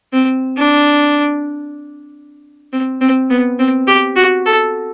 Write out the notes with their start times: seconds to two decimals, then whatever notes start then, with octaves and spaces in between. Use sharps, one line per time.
0.13 C4
0.57 D4
2.72 C4
3.01 C4
3.30 B3
3.59 C4
3.87 G4
4.16 F#4
4.46 A4